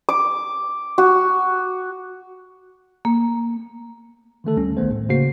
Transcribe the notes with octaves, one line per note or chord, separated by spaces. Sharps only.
D6
F#4
A#3
D3 D#3 A3 A4
D2 G3 C#4
A#1 D#3 A3 B3 C5
A2
C#3 A#3 F#4 C5 C7